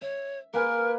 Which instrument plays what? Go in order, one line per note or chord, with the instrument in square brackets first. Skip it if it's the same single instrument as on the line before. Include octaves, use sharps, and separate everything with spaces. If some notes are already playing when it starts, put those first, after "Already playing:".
[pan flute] C#5 [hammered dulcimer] E5
[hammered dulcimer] A#3 B4 G#5 [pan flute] A#4